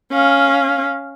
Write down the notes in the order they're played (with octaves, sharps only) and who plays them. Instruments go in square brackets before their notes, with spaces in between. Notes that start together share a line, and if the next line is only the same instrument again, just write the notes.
[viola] C#4 F5